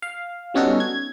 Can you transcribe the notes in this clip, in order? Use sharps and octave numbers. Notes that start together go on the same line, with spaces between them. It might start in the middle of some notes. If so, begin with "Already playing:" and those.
F5
G3 B3 C#4 D#4 F#4 A4
G#6